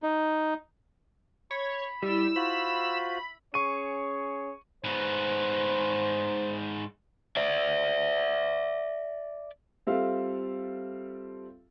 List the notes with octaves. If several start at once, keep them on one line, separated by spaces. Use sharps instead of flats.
D#4
C#5 B5
G3 E4 E6
F4 F#4 C5 B5
C#4 G#4 C#5 C#6 D#7
G#2 B3 C5
D5 E5
G3 C4 F4 A4 E5 F5